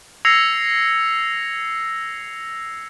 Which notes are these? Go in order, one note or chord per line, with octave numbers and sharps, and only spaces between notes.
E6 G#6 A#6 C7 C#7 F7